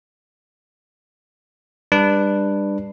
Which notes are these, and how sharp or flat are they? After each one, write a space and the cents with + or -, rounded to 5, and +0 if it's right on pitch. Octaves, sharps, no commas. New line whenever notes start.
G3 +25 D4 +15 B4 +0